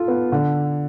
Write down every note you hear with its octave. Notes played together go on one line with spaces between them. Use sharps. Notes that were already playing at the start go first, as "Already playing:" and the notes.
Already playing: F4 A4
B3
D3